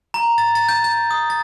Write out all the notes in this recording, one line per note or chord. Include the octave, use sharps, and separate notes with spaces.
A#5
A6
A6
G6
G6
D#6
A6